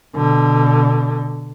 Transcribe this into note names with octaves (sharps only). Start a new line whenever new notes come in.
B2 D3